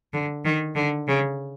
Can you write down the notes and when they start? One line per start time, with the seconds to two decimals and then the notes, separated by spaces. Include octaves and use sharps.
0.13 D3
0.45 D#3
0.75 D3
1.08 C#3